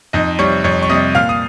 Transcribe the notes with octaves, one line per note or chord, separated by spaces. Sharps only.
F2 D#4 D#5
G3 C#5 C#6
C3
F2 C#5 C#6
C#6
C3 G3 D#5 D#6
A#2 F5 F6
D#6